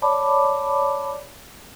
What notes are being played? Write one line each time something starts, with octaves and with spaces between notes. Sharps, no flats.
C#5 D5 A5 B5 D6